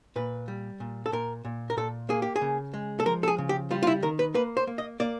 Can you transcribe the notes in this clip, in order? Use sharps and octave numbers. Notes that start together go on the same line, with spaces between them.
A#2 B4
G3
A#2
A4
A#2 A#4
A#2
A#4
A#2 A4
A#3 G#4
G4
G#4
C#3
G#3
A4
F3 A#4
A4
G#4
C#3
G4
G3 F4
F4
E4
D#3 A#4
B4
A#3 B4
C5
A#3
D#5
A#3 D5